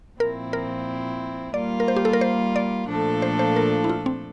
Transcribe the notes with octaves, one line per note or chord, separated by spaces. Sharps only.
A#2 F3 C4 E4 A#4
A#4
G3 A#3 F4 D5
A#4
C5
G4
A4
A#4
C5
D5
A#2 F3 A3 D4 A4
C5
C5
A#4
E4
F4
C4